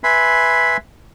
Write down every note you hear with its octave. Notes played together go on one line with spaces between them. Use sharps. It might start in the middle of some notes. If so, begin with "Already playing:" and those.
B4 E5 G#5 B5 C6